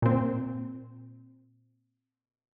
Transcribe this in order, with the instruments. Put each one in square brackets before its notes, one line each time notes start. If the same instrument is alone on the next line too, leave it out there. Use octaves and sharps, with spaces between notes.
[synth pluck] A#2 C4